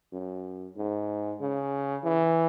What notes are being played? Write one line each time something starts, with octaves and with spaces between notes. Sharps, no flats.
F#2
G#2
C#3
E3